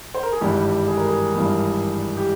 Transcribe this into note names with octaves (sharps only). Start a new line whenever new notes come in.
C5
A#4
G#4
G#1 G2 E3 G3 G4
G#4
A#4
G#4
G#1 G2 E3 G3
G4